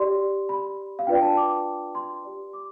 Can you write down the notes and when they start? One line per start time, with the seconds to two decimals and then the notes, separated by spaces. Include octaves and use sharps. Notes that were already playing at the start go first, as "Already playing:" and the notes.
Already playing: G4 D5 C6
0.49 B5
0.99 F5
1.07 D4 F4 B4 D5 G5
1.22 A5
1.37 D6
1.95 C6
2.24 G4 D5
2.53 D6